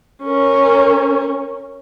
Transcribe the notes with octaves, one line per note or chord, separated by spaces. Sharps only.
C#4 A#4